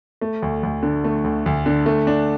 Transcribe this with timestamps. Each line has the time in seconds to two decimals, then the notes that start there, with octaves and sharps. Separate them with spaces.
0.21 A3
0.42 D2
0.63 D2
0.83 D3
1.04 A3
1.24 D2
1.46 D2
1.66 D3
1.86 A3
2.07 D4